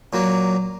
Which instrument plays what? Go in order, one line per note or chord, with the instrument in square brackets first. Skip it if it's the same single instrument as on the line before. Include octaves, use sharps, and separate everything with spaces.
[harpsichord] A#2 F#3 A#3